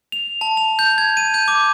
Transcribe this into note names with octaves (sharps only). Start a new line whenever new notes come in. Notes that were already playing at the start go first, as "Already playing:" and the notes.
F7
A5
F7
G6
G#6
D#7
G6
D6